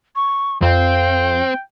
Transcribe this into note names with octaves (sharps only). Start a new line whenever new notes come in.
C#6
F2 C4 F5 G5